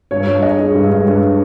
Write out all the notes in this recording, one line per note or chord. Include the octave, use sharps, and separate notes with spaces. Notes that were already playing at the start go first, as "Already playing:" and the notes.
G2 C#5
G2
G#3 D#5
G#3
G2
G2
G2